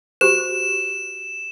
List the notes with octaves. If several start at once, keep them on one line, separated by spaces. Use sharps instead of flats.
F#4 G4 C5 E7